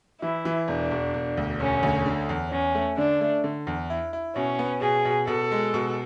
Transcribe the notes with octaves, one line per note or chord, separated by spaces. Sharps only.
E3 E4
E3
E1 D4
E1
E1
D2
E1 C#4
D2
D3
E2
E2 C#4
A3
D3 D4
A3
D3
E2
E4
E4
B2 C#4
B3
B2 G#4
B2
B2 A4
G#3
B2